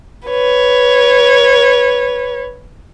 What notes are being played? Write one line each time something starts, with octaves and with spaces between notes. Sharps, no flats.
B4 C#5